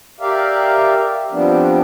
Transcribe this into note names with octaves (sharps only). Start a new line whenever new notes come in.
G4 A#4 D5 E5 F5
F3 G3 B3 C4 D4